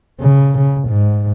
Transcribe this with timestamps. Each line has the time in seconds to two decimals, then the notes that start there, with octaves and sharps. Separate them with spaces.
0.20 C#3
0.58 C#3
0.88 G#2